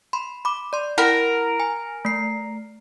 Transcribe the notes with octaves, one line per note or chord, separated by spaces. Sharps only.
B5 C6
B5 D6
D5 C6
E4 A#4 F#5 B5
G#5
A3 C7